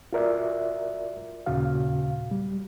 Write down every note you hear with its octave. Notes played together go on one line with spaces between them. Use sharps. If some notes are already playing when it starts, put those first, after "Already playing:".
F4 F#4 A#4 D5 E5
D#2 A#2 C#3 F#4 F5
G3